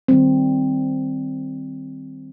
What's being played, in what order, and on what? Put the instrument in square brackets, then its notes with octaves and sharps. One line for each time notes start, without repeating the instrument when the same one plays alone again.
[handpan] D#3 G3 C4